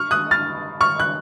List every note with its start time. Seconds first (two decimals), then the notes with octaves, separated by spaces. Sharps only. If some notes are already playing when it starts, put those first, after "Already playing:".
Already playing: C#6 F6
0.11 D#6 F#6
0.31 F6 A6
0.81 C#6 F6
1.00 F#6